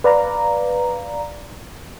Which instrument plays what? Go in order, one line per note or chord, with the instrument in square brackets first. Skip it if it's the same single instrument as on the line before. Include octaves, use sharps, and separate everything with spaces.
[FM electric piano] B4 D5 F5 A#5